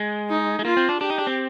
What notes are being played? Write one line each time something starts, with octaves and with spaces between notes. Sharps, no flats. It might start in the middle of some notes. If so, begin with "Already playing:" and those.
Already playing: G#3
D#4
G#3
A#3 F4
C4
D4
D4 G4
D#4
D4
C4